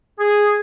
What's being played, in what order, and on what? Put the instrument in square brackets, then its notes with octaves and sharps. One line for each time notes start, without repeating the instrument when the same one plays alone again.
[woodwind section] G#4